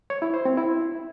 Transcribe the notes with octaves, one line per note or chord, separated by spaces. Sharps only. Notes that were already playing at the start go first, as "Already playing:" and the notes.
C#5
E4
C5
C4
E4